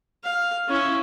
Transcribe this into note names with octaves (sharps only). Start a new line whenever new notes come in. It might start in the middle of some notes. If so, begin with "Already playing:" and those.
F5
C#4 E4